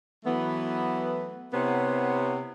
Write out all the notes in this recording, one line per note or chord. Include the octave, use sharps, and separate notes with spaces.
E3 F#3 A3 B3
C3 B3 E4 C5 C#5 F#5